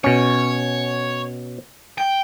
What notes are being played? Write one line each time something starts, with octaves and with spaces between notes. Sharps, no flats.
B2 C#4 C#5
G5